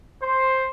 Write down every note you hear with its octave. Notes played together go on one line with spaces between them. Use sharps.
C5